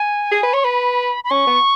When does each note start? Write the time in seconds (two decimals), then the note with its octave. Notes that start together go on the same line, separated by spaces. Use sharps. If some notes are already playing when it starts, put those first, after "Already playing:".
Already playing: G#5
0.31 G#4
0.43 B4
0.54 C#5 C#6
0.64 B4 B5
1.24 B5
1.31 C#4 C#6
1.47 B3